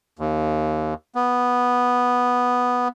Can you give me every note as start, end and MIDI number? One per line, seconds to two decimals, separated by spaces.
0.19 0.94 39
1.15 2.88 59